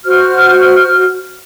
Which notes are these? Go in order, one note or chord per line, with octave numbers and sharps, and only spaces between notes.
F#4 C5 F6